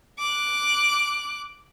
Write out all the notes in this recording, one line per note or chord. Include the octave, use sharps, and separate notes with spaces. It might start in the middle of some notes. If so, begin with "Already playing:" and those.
D6 F#6